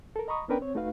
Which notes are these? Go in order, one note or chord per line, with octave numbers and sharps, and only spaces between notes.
A4 A#4
D#5 A#5 B5 C#6 D#6
B3 C#4 D4 A#4 B4 G5
C4 C#5
A3 D#4 F#4 B4 F5